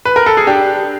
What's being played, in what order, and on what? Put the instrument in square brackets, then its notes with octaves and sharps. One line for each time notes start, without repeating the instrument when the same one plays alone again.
[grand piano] B4
A#4
A4
G#4
D4 G4